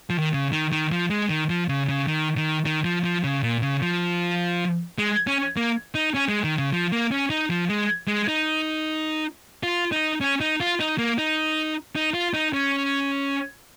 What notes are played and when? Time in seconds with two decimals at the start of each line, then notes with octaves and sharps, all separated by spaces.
0.10 F3
0.18 D#3
0.33 C#3
0.52 D#3
0.72 D#3
0.92 F3
1.10 G#3
1.29 D#3
1.50 F3
1.69 C#3
1.89 C#3
2.07 D#3
2.37 D#3
2.66 D#3
2.84 F3
3.04 F3
3.24 C#3
3.43 A#2
3.62 C#3
3.82 F3
4.98 G#3
5.27 C#4
5.57 A#3
5.95 D#4
6.14 C#4
6.29 G#3
6.44 D#3
6.58 C#3
6.72 F3
6.92 A#3
7.11 C#4
7.30 D#4
7.50 F3
7.69 G#3
8.08 G#3
8.28 D#4
9.63 F4
9.92 D#4
10.21 C#4
10.41 D#4
10.60 F4
10.80 D#4
10.98 A#3
11.18 D#4
11.96 D#4
12.14 F4
12.34 D#4
12.54 C#4